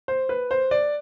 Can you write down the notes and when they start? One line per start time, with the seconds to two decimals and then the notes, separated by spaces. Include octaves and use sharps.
0.08 C5
0.29 B4
0.51 C5
0.71 D5